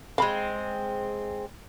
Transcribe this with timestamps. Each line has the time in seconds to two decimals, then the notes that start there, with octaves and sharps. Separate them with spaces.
0.18 G#3 C4 F5 B5